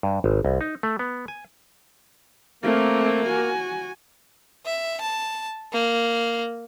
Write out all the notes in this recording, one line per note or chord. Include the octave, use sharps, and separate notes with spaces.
G2
G#1
C2
D#4
A3
B3
G#5
A3 A#3 C4
F#4 G#5
E5
A5
A#3